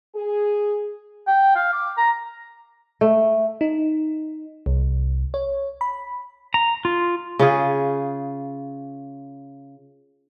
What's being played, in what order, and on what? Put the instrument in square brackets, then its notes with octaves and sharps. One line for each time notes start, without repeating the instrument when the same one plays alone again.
[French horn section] G#4
[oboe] G5
F5
D6
A#5
[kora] A3
[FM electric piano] D#4
C2
C#5
B5
[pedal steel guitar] A#5
F4
[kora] C#3 F4 G#4